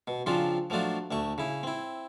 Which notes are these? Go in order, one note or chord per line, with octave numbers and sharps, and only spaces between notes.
B2
C#3 F3 C4 D4 F4
F3 F#3 A3 D4 F4
D2 A3 C#6
C#3 E4
C4 E4